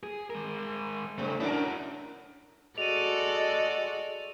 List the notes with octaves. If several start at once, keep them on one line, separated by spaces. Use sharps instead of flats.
G#4
G#3 A#4
G2 C#3 A3 C4
C#4 D4 E4 F#4 A#4
G#3 F#4 A4 D5 D#7 F7